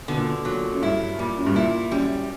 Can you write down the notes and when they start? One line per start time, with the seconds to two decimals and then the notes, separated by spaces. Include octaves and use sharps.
0.08 B2 D3
0.17 A#2
0.24 B2
0.45 A#2 F#3
0.72 F#2
0.82 G2 E4
1.18 A#2 G3
1.37 F#2
1.46 G2
1.55 A#2 E4
1.91 F#2 G3